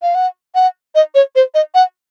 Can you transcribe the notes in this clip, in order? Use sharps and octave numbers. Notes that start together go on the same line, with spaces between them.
F5
F#5
F#5
D#5
C#5
C5
D#5
F#5